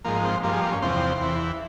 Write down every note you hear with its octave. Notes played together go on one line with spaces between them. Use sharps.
G#2 F3 A#3
C4
G2 F3 A#3
G#3
A#3
C#4
E2 C3 F3 C4
E2 E3